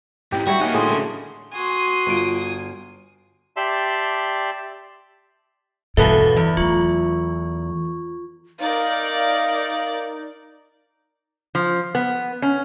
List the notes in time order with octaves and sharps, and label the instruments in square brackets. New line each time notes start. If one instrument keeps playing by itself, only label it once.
[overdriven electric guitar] G#2 E3 [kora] G4
[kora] G3 C#5 E5 [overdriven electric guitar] F#4
[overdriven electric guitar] A#3 D#4 [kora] C#4 F#4
[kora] A2 A#3 G#4 [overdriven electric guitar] D3 C6
[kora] G#3 A3
[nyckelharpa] F#4 C6 [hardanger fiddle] G#5 D#6
[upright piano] G1 F4 D7
[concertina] G4 D5 E5 A5 C6
[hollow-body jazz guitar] E2 B2 B3 [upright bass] G2 [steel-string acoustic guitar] A4 B4 [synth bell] E5 F5
[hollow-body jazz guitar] E2
[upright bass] F#3 A3 [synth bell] F4 C#6
[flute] D#4 [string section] A#4 D5 [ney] F5
[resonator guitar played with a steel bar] F3
B3
C#4